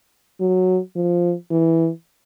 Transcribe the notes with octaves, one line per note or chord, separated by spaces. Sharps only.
F#3
F3
E3